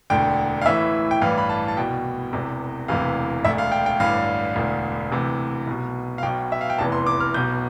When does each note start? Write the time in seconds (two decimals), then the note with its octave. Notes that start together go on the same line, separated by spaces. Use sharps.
0.10 E1 D2 D3 G5
0.62 F5
0.66 A1 A2 E3 E5
1.11 G5
1.21 A1 G2 E3 F5
1.38 B5
1.49 A5
1.68 A5
1.77 C2 B2 G5
2.33 E1 E2 C3
2.88 E1 D2 C3 E3 F5
3.45 E1 D2 D3 E5
3.58 F5
3.72 G5
3.86 G5
4.00 A1 G2 D3 F5
4.56 E1 D2 D3
5.11 D2 C3 E3
5.67 B1 B2
6.18 F5
6.23 B1 B2 G5
6.52 E5
6.61 F5
6.70 G5
6.78 F1 E2 C3 E3 A5
6.92 C6
7.07 D6
7.20 F6
7.34 B1 B2 G6